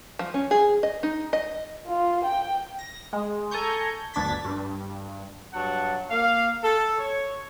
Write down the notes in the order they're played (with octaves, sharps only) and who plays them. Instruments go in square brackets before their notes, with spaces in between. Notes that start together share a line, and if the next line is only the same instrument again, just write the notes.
[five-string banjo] F3
C#4
G#4
D#5
D#4
D#5
[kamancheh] F4
G5
[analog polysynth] A#6
G#3
A4 G#5 A#5 C#6 G6
G1 D2 D4 G#6 A6 B6
G2
[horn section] G2 F#3 F#5 A5
A#3 F5
A4
C#5